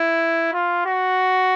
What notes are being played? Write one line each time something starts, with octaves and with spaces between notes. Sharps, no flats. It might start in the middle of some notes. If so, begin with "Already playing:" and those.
Already playing: E4
F4
F#4